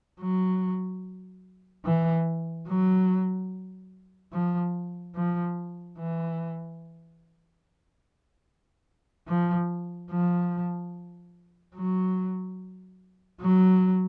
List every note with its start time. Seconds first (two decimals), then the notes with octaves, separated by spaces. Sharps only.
0.21 F#3
1.85 E3
2.68 F#3
4.33 F3
5.15 F3
5.98 E3
9.28 F3
10.11 F3
11.75 F#3
13.41 F#3